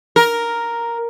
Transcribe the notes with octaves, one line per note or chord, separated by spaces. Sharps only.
A#4